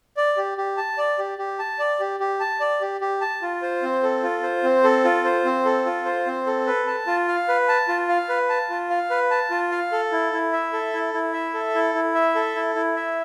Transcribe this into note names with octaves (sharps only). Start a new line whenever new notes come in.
D5
G4
G4
A5
D5
G4
G4
A5
D5
G4
G4
A5
D5
G4
G4
A5
F4
C5
C4
A4
F4
C5
C4
A4
F4
C5
C4
A4
F4
C5
C4
A4
B4
A5
F4
F5
B4
A5
F4
F5
B4
A5
F4
F5
B4
A5
F4
F5
A4
E4
E4
E5
A4
E4
E4
E5
A4
E4
E4
E5
A4
E4
E4
E5